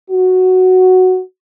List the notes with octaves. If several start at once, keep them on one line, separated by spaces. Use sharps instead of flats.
F#4